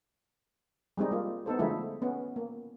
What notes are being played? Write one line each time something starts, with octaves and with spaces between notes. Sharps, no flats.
G3 G#3 C4 D#4
A#3 F4
B3 D#4 A4 C5
D3 F3 G#3 A3 D#4 E4
B3 C#4
A#3